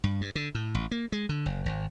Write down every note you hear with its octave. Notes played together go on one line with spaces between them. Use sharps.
G2
G2
D3
A2
A1
A#3
G#3
D3
F#1
G#1